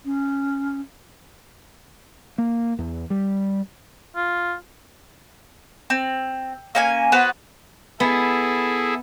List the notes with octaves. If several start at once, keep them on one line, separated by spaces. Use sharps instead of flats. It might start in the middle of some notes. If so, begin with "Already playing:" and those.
C#4
A#3
E2
G3
F4
C4
A#3 C#4 G#5
B3 F#4 B4 C5
B3 E4 G#4 A4